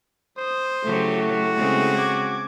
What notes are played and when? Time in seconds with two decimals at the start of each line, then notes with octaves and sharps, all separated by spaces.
0.38 C5 D#6
0.84 C#3 F#3 A3 E4 G4
1.18 F#4
1.56 C#3 G#3 C4
1.97 D6 G#6